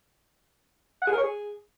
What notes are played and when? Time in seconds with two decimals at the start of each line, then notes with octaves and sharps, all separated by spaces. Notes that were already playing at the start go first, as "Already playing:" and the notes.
1.02 F#5
1.07 G#4
1.13 A#4
1.18 C#5
1.23 G#4